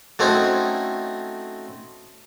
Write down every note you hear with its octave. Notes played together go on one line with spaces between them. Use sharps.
F#3 A3 C4 C#4 D#4 E4